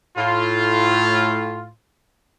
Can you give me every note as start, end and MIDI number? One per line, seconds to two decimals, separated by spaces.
0.17 1.70 45
0.17 1.70 65